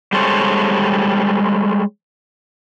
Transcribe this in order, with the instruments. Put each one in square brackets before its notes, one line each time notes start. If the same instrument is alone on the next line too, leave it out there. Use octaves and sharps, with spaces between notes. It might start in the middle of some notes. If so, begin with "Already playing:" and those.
[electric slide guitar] G3 G#3 A4 C5 C#5